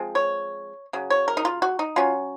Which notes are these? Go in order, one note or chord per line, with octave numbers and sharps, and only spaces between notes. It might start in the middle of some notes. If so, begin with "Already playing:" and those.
Already playing: F3 G#3 C4
C#5
C#3 F#3
C#5
A#4
D#4
F4
F#4
D#4
F#3 C#4 F4